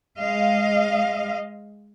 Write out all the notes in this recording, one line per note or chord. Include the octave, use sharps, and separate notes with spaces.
G#3 D#5 F5